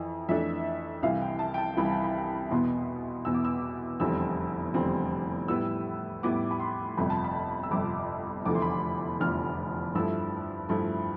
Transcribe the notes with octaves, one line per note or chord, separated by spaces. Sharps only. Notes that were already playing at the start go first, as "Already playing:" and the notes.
Already playing: F2 E3
F2 E3 A3 D4 E5
C2 C3 E3 F5
G5
A5
G5
A5
C2 C3 E3 B5
A5
B5
E2 B2 B3 C6
E2 B2 B3 E6
D6
E6
F1 E2 D3 G3 C4 E6
F1 E2 D3 G3 C4
A2 G3 B3 E4 E6
A2 G3 B3 E4 D6
B5
C6
G1 F2 C3 B5
A5
B5
E6
G1 F2 C3 D6
F1 E2 D3 F3 A3 D6
C6
B5
C6
F1 E2 D3 F3 A3 F6
G2 F3 A3 E4 E6
G2 F3 A3 E4